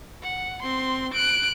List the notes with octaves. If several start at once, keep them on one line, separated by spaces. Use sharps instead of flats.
F#5
C4 C6
F#6 D7